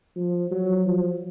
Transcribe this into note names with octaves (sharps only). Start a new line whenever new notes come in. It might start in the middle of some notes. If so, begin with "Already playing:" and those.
F3
F#3
F3